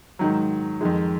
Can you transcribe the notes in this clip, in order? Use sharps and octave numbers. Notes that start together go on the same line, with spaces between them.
G#2 D#3 F#3
F2 D#3 G#3